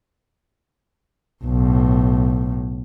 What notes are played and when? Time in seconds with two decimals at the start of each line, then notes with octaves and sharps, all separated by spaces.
1.44 B1 A2